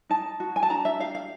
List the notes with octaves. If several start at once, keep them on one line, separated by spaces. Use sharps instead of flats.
D#4 A5
F#4
G#5
A5
D4 A#5
E5
G4 F5
F5